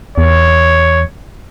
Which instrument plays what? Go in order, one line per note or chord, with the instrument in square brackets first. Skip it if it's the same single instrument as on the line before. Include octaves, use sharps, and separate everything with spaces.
[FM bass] E2 [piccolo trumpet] C#5